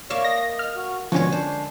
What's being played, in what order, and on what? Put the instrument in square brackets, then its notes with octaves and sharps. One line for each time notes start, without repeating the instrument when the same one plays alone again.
[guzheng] A#3 E5 F5 [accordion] C#5 D5
[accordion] D#5 [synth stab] A#6
[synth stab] F6
[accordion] F#4
[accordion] B2 C#6 [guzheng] D3 G#3 C#5 [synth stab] F3 C#4
[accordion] D4 [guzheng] C5